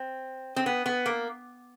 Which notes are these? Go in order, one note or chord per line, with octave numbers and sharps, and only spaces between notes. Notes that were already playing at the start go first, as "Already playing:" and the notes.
Already playing: C4
C4
B3
B3
A#3